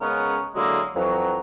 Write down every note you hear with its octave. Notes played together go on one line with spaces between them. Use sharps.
C#3 G#3 B3 C#4 A#4
D3 F#3 G#3 A#3 E4
F2 E3 F#3